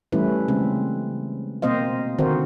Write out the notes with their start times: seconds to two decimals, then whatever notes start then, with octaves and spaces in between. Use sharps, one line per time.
0.12 E3 G3 A3 C#4 E4 B4
0.48 C#3 G#3 C4
1.62 B2 A#3 C4 C5 D#5 F5
2.18 D3 D#3 C4 F#4 A#4 C5